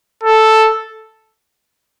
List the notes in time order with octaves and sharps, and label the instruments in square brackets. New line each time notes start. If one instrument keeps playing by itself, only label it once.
[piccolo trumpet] A4